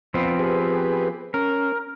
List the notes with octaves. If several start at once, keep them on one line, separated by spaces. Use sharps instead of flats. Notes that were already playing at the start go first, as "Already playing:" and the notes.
F3 B3 C4
G4 G#4 B4
C#4 A#4